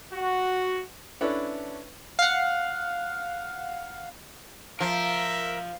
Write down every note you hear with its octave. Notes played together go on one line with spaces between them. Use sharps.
F#4
C#4 D4 E4 A4 B4
F5 F#5
F3 A#4 E5